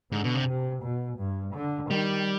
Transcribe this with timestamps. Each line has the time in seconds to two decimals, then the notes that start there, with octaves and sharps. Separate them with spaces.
0.11 G#2 D3
0.24 B2
0.35 C3
0.47 C3
0.83 B2
1.18 G2
1.54 D3
1.90 D#3 G3